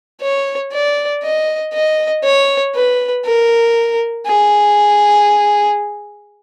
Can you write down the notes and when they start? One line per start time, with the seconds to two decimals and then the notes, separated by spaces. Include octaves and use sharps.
0.22 C#5
0.72 D5
1.23 D#5
1.73 D#5
2.24 C#5
2.75 B4
3.25 A#4
4.27 G#4